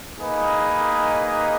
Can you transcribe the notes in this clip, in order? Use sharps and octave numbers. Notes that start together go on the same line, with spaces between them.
A#3 D#4 G#4 B4 D#5